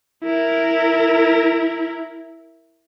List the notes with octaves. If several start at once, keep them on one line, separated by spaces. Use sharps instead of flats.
E4 A#4